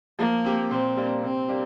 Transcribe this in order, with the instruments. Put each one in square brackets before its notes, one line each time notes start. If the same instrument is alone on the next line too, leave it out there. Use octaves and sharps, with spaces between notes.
[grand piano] F3 [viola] A#3
[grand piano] C4 G4
[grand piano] A#2 [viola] C4
[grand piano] G3 A#3 D4
[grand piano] C3 [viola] C4
[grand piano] G3 A#3 D4 G4